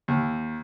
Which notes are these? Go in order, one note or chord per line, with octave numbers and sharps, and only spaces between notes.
D#2